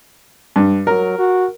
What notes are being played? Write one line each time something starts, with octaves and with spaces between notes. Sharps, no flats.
G2
F#3 A#4
F#4